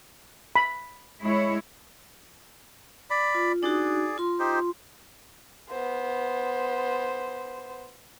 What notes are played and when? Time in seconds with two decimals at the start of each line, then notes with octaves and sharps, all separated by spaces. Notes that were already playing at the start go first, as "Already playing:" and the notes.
0.56 B5
1.20 G#3 E4 C#5
3.10 D5 B5
3.34 F4
3.63 D4 D#4 F#4 G#4 D5
4.18 F4 C6
4.39 D#4 G4 C5
5.70 B3 C5